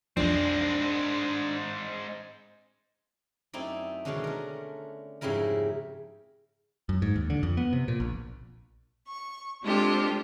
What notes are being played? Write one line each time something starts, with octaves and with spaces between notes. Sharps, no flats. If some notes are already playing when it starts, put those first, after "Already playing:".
B1 F2 G#3 C4 D4
F#2 A3 C4 D#4 E4 D5
B2 D3 D#3 G#3 C#4 D4
A3 A#4
F2 G#2 C#3 G3 E4 A#4
F#2
G#2
D#2
D3
F2
B3
C3
A#2
A#1
C#6
G#3 C4 D4 F4 G4 A4